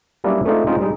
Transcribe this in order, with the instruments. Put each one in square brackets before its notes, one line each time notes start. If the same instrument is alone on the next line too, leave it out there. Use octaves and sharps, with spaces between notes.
[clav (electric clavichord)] F#3 G3 A#3 C#4 D4 E4
G#3 A3 C4 D4 D#4 F4
F3 G#3 C4 C#4 D#4 F4
G3 G#3 D#4